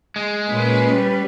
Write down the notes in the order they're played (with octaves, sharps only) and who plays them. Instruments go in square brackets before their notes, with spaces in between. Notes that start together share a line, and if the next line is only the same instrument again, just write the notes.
[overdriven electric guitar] G#3
[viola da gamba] A#2 [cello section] C#4 B4
[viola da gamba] G3